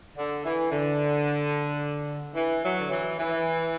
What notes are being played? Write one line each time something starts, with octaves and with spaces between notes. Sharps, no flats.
D3
E3
D3
E3
F#3
D3
E3
E3